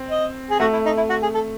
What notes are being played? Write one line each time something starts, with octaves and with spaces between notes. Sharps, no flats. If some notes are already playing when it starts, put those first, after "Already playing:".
Already playing: C4
D#5
G#4
A3 F#4
E4
D#4
E4
F#4
G#4
A4